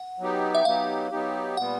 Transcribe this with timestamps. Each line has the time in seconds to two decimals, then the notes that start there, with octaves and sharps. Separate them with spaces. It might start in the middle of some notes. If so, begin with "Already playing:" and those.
Already playing: F#5
0.19 F#3 B3 D#4 G4
0.55 E5
0.65 F#3 B3 D#4 G4 F5
1.11 F#3 B3 D#4 G4
1.57 A#2 G3 B3 F#5